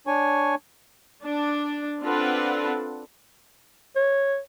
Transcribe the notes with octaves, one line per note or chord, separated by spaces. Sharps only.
D4 C#5 G#5 C#6
D4
C4 D4 F4 A4 B4 F#5
C#5